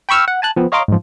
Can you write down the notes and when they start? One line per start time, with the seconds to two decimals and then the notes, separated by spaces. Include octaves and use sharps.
0.09 G5 B5 C#6 E6 F6
0.28 F#5
0.42 G#5 A5 F#6
0.56 F3 B3 C4
0.72 C#5 D#5 F5 A#5 C6 D6
0.88 G#2 F3